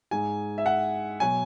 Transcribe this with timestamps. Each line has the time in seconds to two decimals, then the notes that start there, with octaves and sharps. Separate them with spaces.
0.11 G#2 G#3 G#5
0.58 E5
0.66 F#5
1.20 B2 F#3 G#5